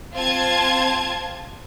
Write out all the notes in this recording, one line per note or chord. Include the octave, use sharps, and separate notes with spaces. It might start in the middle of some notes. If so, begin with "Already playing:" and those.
C4 F4 A5 G#6